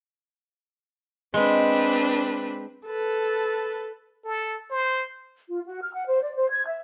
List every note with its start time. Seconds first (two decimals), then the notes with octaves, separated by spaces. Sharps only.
1.34 G#3 C4 D4 B4
2.87 A4 B4
4.24 A4
4.71 C5
5.50 F4
5.66 F#4
5.82 F6
5.93 F#5
6.07 C5
6.23 D5
6.35 C5
6.50 G#6
6.67 E5